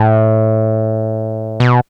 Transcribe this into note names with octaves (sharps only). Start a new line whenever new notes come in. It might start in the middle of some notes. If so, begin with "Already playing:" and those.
Already playing: A2
B2